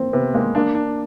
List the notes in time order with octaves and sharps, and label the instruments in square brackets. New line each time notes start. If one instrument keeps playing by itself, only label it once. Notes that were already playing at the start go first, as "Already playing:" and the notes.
Already playing: [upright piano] A#3 C4
[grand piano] C3 [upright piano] B3
[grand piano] G#3 [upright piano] A#3
[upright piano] A#3 [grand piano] D4
[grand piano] D4